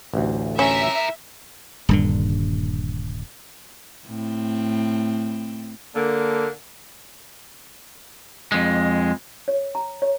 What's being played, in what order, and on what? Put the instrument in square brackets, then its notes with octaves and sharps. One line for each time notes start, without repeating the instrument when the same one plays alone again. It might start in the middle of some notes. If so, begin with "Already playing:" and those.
[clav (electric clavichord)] A1 D2
[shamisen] C#4 [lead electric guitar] E4 A#4 [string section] E5
[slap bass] D#1 G2 D3
[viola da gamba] A2 C4
[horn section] D3 A#3
[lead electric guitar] F2 G#3
[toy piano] C#5
A#5
C#5